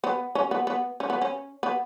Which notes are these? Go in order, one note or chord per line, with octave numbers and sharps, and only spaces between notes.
B3
C#4
B3
B3
C#4
B3
C#4
B3